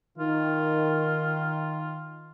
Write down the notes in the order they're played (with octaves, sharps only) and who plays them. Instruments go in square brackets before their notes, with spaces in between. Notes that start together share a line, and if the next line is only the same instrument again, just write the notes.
[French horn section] D#3 [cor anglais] F4